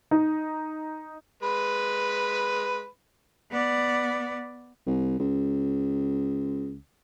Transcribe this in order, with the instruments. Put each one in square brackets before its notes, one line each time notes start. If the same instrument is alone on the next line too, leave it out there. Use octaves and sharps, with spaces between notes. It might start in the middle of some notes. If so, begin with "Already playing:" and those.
[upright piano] D#4
[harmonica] G#3 B4 B5
[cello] B3 D5
[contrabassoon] C2
C#2